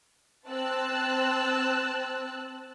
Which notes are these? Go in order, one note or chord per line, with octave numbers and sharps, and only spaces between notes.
C4 A5 E6 F#6